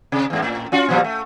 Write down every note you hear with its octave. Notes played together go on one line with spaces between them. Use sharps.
C3
E2 G#2
A2
C#4 F4 F#4
A#2 F3 G3
A3